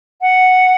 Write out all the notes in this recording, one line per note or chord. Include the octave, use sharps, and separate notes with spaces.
F#5